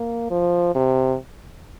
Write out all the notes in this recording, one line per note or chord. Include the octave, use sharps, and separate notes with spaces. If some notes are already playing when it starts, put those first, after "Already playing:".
Already playing: A#3
F3
C3